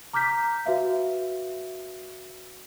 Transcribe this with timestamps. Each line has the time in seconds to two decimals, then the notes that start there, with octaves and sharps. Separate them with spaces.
0.13 A#5 D6 F6 G6 B6
0.66 F#4 B4 E5 F5